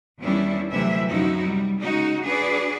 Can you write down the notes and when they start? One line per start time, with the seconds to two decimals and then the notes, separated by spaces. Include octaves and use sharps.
0.19 E2 D#3 G3 C#4 D4 E4
0.72 D2 C3 E3 F#3 E4 E5
1.07 F#2 C3 F3 D#4 E4 F#4
1.46 G3
1.79 C#3 G#3 D#4 F#4
2.24 D4 F#4 G#4 B4 D5